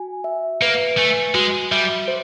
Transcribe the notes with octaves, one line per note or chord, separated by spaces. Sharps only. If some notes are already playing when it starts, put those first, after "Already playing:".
Already playing: F#4 G#5
E5
A#3 B4
A3 G#5
G#3 F#4
G3 E5
C5